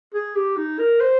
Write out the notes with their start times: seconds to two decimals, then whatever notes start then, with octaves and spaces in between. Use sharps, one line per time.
0.14 G#4
0.35 G4
0.57 D#4
0.79 A#4
1.00 C5